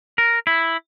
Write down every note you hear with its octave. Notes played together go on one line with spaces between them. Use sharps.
A#4
E4